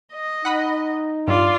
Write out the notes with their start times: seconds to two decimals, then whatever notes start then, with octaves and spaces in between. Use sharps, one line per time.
0.13 D#5
0.45 D#4 F#5 B5 D#6
1.28 G2 F4 D5